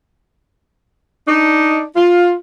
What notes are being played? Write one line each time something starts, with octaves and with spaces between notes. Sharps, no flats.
D4 D#4
F4